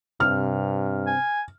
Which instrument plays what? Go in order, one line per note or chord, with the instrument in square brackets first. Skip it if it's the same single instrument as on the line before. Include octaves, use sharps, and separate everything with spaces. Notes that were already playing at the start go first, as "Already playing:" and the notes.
[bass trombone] G2 [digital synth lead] C3 [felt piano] F6
[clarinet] G#5